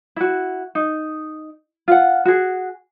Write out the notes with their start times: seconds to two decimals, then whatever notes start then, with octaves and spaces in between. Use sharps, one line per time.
0.16 E4 F#4
0.75 D#4
1.88 F4 F#5
2.25 F#4 G#4